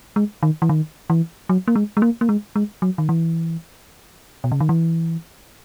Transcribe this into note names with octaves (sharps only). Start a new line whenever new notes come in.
G#3
D#3
E3
D#3
E3
F#3
A#3
G#3
G#3
A#3
A#3
G#3
G#3
F#3
D#3
E3
B2
C#3
D#3
E3